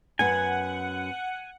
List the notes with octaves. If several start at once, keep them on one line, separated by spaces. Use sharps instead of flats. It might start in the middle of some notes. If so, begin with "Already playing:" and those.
F#2 B3 F#5 G#5